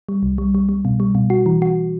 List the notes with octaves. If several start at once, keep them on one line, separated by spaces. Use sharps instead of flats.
G3
C2
G3
G3
G3
B2
G3
B2
F#4
E3
F#4